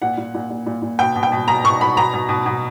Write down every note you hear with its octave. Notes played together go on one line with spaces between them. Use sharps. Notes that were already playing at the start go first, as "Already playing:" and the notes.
A#2 F#5
A#2
A#2
A#2
A#2
A#2
B2 G5
B2
G5
B2
B2 A#5
B2 C#6
B2 B5
B2 A#5
B2
B2
B2